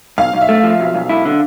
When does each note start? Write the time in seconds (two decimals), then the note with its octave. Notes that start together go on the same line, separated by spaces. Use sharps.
0.18 B1 F5
0.33 B1
0.41 E5
0.49 A3
0.63 F3
0.80 B1
0.94 B1
1.09 E4
1.25 D3